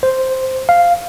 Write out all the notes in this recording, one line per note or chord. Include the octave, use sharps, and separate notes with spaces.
C5
F5